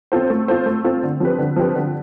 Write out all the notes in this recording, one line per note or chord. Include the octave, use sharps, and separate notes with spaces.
C4 F4 A4 C5
A3
C4 F4 A4 C5
A3
C4 F4 A4 C5
D3
F3 C4 G4 B4
D3
F3 C4 G4 B4
D3